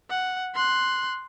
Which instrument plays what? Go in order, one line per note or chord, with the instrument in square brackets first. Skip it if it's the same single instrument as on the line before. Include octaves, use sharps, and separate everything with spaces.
[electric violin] F#5
C6 F#6